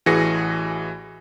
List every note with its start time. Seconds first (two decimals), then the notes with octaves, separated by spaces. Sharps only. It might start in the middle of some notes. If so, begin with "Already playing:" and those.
0.06 A1 E3 F#4 G#4 A#6 C#7